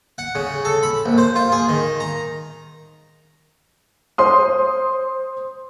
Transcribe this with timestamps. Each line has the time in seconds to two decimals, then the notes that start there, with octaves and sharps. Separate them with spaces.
0.18 F#5
0.35 C#3
0.65 A4
0.83 B5
1.05 A#1
1.18 C5
1.35 F4
1.52 G#4
1.69 D#3
2.00 A#5
4.18 C5 C6 D#6